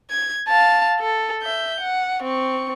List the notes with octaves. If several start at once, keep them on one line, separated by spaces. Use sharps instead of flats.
G#6
F5 A5
A4
E5 G6
F#5
C4 C#6